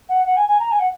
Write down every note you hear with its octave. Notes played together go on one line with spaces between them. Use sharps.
F#5
F#5
G#5
G#5
A#5
G#5
F#5